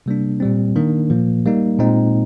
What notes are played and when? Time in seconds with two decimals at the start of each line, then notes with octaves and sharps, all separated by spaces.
0.06 C3 G3 A#3 D4
0.40 A#2 G3 C4
0.76 D#3 A#3 D4
1.10 A#2 F3 A#3
1.45 G3 A#3 D#4
1.79 A#2 G#3 C4 D#4